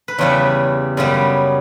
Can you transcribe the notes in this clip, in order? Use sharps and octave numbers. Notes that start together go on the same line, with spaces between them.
B4
E2 C#3 G3 C#5
F#2 C#3 G3 B3